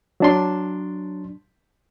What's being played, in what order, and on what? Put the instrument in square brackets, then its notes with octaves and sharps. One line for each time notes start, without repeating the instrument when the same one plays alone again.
[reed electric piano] F#3 D4 C6